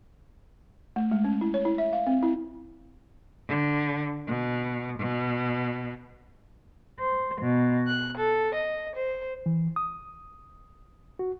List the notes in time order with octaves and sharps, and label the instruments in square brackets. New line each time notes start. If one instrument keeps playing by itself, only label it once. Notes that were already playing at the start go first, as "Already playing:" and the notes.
[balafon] A3
G#3
C#4
E4
C#5
E4
E5
F5
C4
E4
[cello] D3
B2
B2
[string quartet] C5
B2
F#6
A4
D#5
C5
[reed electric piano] E3
D#6
F#4